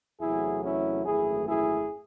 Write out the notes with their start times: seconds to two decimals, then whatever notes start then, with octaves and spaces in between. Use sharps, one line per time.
0.21 E2 C3 F#3 A3 E4 G#4
0.63 C#4 E4
1.05 G#1 F#2 E3 A3 E4 G#4
1.48 E4 G#4